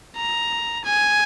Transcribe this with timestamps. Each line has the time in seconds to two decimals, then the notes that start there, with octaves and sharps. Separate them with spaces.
0.16 A#5
0.84 G#5